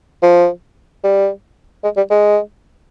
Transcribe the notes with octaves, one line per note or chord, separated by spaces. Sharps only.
F3
G3
G#3
G3
G#3